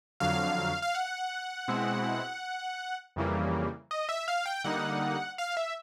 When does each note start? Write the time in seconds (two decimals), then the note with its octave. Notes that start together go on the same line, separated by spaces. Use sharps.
0.20 F2 D3 F#3 F5
0.82 F5
0.95 F#5
1.68 B2 G#3 C4 E4
3.16 F2 C#3 E3 G3 A#3
3.91 D#5
4.09 E5
4.28 F5
4.46 G5
4.64 D3 G3 A#3 D#4 F#5
5.38 F5
5.57 E5